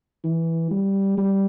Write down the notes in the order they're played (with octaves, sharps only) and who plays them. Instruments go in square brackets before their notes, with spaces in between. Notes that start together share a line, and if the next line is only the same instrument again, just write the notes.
[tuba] E3
G3
G3